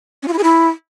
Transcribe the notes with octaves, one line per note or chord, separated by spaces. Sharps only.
C#4
F4
E4
G#4
E4